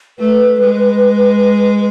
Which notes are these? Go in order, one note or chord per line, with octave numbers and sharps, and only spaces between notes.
A3 B4
G#3